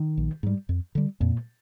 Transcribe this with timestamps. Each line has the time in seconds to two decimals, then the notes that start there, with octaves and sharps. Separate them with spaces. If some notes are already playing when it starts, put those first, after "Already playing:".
Already playing: D#3
0.18 A#1
0.43 G#2 G3
0.69 F2
0.95 D3 G3
1.21 F2 A#2